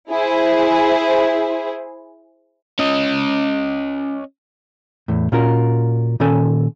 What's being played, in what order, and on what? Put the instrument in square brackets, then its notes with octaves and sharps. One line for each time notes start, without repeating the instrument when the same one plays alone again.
[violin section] E4 G#4 C5
[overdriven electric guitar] C#4 D#5
[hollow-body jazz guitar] E2 A2
A#2 C#4 F4 F#4 A#4
A#2 D#3 C#4 A4 G#5